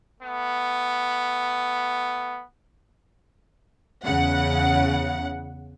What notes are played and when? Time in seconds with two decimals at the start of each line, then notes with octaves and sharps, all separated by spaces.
0.21 A3 B3
4.05 E2 C#3 F#5